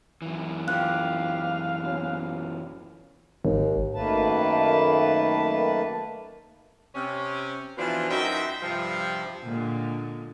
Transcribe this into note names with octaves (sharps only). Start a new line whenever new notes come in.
F#2 E3
C4 F4 G4 F5 F#6
B2 C#4
G#1 D#2
F#2 D#3 A3 A#3 B4 A5
C3 C#4
B2 E3 F3 B3 D4 F4
F#2 D#4 F#4 C5 E5 G5
G2 C3 F3
A#2 D3 G#3